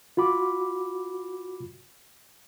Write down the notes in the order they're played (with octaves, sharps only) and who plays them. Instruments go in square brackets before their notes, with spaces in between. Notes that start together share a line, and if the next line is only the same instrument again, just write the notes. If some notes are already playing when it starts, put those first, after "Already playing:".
[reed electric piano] F4 F#4 B5 D6